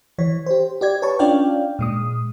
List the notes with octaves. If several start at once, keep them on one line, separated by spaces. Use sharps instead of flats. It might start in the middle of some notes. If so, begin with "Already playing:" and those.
E3 C#5
G4 C5
G4 D5 G#6
B4 C#5 A5 C#6
C#4 D4 F4 D5 F5 G5
A#2 G#3 D#6